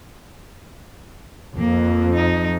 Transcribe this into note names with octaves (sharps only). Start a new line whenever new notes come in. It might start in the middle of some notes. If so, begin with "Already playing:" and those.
F2 A#3
D#4